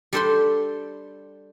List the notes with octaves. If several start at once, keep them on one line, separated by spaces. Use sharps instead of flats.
G3 D4 A4 C5 B5 C6